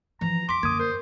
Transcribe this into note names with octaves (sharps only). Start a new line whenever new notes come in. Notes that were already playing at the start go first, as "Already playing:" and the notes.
E3 F3 A#5
F2 C6 D6 B6
F#2 D3 A#3 D#6 G#6
A#4 C5